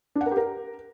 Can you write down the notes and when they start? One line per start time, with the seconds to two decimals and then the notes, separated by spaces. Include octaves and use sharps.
0.15 D4
0.21 F#5
0.26 A#4
0.31 G4
0.37 A#4